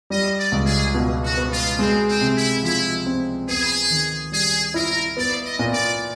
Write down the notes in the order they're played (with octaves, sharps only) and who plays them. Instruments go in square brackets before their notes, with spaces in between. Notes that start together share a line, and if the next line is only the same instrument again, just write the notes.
[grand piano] G3 [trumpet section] D#5
[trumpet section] D5
[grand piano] C#2
[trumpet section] G#4
[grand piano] B2
[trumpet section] F#4
[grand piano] B3
[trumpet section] F4
[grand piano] G#3 [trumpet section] C4
[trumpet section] C4
[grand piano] C3
[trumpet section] E4
[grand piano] F3 [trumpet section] E4
[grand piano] C4
[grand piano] B3 [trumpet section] G#4
[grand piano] D#3
[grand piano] G3 [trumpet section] G#4
[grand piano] E4 [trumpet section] A#4
[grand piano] B3 [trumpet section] D5
[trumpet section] D#5
[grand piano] A#2
[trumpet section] D5